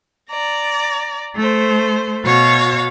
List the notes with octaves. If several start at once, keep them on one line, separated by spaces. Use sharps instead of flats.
D5 A#5
A3 C5
B2 F#4 C#5 F5